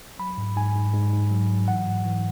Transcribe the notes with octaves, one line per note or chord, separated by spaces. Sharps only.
F#3 B5
G#2
G#2 G#5
G#2
G#2
G#2
F#3
F#3
E3 F#5
G#2
E3